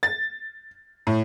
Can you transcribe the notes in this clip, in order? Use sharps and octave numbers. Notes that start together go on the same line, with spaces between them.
A6
A2